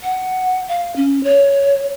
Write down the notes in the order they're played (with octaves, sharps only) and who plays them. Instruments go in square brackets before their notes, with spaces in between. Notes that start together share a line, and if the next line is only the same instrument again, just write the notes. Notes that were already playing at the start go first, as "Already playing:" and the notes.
[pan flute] F#5
F5
C#4
C#5